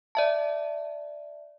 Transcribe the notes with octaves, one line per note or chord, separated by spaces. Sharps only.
D5 E5 A5